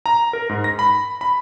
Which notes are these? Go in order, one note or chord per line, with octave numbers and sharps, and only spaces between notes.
A#5
A#4
G#2
A#6
B5
B5